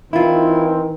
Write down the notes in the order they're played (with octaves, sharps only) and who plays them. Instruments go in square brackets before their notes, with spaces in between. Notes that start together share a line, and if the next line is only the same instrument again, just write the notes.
[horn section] D#3 E3 C4 [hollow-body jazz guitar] E4 F4